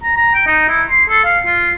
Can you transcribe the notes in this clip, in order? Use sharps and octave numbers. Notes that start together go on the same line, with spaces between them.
A#5
A#5
G5
D#4
E4
C6
A4
F5
F4